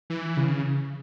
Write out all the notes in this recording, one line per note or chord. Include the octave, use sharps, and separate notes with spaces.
E3
C#3